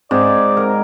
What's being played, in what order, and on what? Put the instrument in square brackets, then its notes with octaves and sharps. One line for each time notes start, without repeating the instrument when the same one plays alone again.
[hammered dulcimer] G#2 [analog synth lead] C4 [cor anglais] D5
[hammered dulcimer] A#4